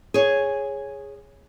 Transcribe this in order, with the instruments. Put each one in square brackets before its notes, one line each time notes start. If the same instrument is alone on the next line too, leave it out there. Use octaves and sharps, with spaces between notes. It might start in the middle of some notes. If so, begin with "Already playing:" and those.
[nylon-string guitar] G#4 C#5